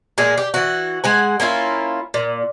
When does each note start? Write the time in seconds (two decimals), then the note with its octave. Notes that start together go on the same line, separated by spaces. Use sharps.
0.18 A#2 G#3 G#4
0.38 G4
0.54 E3 F#4
1.04 G#3 F#5 G#5
1.40 A#3 C#4 E4 F4
2.14 A#2